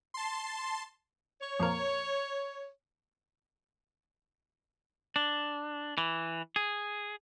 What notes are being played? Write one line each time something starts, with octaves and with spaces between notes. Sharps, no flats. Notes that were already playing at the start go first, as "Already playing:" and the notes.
A5 C6
C#5
F2 A#2 A#4
D4
E3
G#4